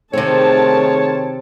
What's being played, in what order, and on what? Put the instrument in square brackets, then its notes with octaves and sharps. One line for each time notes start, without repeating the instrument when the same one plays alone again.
[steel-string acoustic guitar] C3 C4 [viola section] D#3 A5 [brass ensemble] A3 G#4 [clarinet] C#5